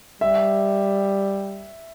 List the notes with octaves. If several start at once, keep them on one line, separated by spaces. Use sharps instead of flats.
G3 E5